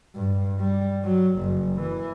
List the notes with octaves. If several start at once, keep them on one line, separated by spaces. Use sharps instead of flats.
G2
G3
F#3
F#1
E3